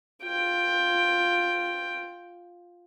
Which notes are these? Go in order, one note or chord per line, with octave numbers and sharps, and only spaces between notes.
F4 G5